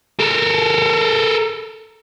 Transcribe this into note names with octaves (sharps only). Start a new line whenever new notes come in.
A4 A#4